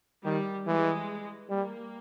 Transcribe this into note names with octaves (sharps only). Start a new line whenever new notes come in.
D#3 G3
E3 G#3
G3 A#3